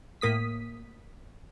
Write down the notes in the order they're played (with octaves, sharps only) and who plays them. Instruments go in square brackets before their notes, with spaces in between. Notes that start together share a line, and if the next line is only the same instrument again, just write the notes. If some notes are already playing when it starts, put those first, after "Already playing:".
[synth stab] A2 A#3 D#6 B6